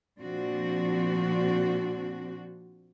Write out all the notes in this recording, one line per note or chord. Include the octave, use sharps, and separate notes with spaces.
A#2 F3 C4 D4 F#4